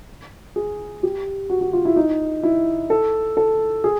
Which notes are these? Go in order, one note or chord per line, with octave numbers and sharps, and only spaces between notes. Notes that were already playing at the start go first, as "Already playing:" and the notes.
G#4
G4
F#4
F#4
F4
E4
D#4
E4
A4
A4
G#4